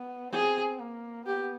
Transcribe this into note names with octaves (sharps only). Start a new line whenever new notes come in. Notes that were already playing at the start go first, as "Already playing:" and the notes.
Already playing: B3
C4 G#4
A#3
B3 G4